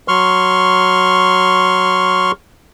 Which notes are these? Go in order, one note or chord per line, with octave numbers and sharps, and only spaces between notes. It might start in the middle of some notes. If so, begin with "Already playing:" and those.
F#3 C6 C#6 F6